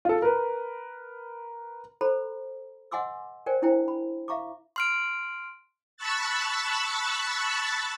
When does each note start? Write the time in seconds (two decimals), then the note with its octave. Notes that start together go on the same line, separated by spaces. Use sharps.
0.05 F4 A4
0.22 A#4 B4
2.01 A4 C5 A#5 B5
2.91 D#5 F#5 G#5 C6 D6 E6
3.46 A#4 C5 D5 G5 G#5
3.62 C#4 D4 E4 C5 G5 A#5
3.88 B5
4.28 E5 F5 A#5 C#6 D6
4.76 C6 F6 D7
5.97 A5 B5 C#6 E6 F#6 A6